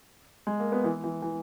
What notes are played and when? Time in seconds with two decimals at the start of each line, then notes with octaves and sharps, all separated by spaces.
0.47 G#3
0.60 A#3
0.72 B3
0.84 E3
1.04 E3
1.22 E3